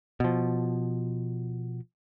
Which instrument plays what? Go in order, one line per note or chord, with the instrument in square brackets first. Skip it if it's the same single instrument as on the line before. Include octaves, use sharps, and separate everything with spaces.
[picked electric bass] B2 F3